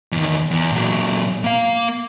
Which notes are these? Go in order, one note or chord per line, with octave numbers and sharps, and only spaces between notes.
E2 D#3
E2
A#2 F#3
A#3 F5